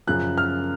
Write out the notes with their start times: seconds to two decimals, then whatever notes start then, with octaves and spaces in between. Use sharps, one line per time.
0.07 F#2 C#3 F3 F#6
0.38 F6